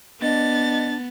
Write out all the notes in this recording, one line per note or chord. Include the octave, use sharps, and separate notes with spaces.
B3 D4 D#5 A6